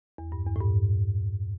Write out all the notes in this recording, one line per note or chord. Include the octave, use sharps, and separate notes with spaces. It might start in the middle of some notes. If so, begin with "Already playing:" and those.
E2
G2
E2
A2
G2